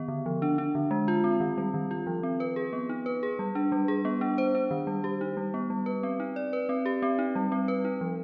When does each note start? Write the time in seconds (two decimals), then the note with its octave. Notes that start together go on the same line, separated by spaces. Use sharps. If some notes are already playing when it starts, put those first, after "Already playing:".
Already playing: D#3 B3
0.08 D3
0.26 F3
0.42 D4
0.58 D4
0.75 D3
0.91 G#3
1.08 F4
1.24 C4
1.40 D#3
1.58 G3
1.74 D#3
1.91 F4
2.07 F3
2.23 C4
2.40 B4
2.56 G#4
2.73 B3
2.89 D#4
3.06 B4
3.23 G#4
3.39 G3
3.55 D4
3.72 G3
3.88 G#4
4.05 B3
4.21 D4
4.38 C5
4.55 D4
4.71 D#3
4.87 G3
5.04 G4
5.21 D#4
5.37 G3
5.54 B3
5.70 G3
5.86 B4
6.03 C4
6.20 D#4
6.36 D5
6.53 B4
6.69 C4
6.86 G4
7.02 C4
7.19 D#4
7.35 G3
7.52 C4
7.68 B4
7.85 D#4
8.01 F3